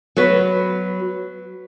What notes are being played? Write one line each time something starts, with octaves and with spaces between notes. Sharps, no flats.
F#3 B3 F#4 B4